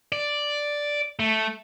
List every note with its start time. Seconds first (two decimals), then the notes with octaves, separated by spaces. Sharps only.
0.12 D5
1.19 A3